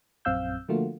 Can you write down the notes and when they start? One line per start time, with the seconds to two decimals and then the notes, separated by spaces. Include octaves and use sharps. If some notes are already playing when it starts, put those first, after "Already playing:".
0.25 A#1 F#2 C4 F5 E6 G6
0.69 D3 F3 A3 A#3 F4 F#4